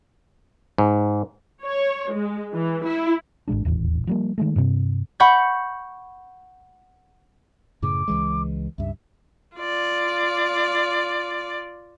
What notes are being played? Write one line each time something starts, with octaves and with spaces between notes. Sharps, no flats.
G#2
C#5
G#3
E3
E4
G#1 G#2 G#3 D4
D#1 A1 E2
F3 G3 A#3
D#3 G#3 A3
G2 C3
F#5 B5 C#6 G6
F#2 A2 C#3 D6
C#2 E3 G#3
C#2 G2 E5
F4 D5